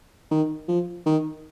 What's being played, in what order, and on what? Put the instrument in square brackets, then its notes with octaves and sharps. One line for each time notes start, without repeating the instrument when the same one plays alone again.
[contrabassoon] D#3
F3
D#3